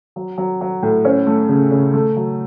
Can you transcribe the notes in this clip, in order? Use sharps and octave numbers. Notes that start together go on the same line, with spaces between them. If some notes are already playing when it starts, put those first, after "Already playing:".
F#3
F#3
F#3
A2
C#4
A3
C#3
C#3
A3
F#3